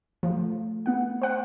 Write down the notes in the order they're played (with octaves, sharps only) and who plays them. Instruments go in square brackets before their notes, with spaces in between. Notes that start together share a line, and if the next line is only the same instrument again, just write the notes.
[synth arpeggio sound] F3 [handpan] A3
[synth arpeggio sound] B3 F#5
C5 F#5